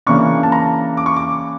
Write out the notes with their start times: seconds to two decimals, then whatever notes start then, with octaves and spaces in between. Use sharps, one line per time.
0.06 C#3 E3 A#3 D4 C#6
0.43 A5
0.52 A#5
0.97 D6
1.06 C#6
1.16 D6